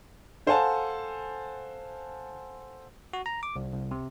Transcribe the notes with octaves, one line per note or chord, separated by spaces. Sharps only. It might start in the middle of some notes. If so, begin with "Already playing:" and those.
A4 C5 F5 F#5 G#5 A5
F#4
A#5
D6
C2
C2
C3